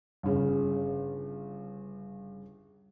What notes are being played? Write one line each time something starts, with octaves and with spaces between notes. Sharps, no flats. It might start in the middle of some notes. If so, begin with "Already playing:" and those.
G1 C#3